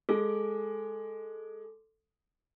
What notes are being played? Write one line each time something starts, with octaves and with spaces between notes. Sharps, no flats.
G#3 A4 D6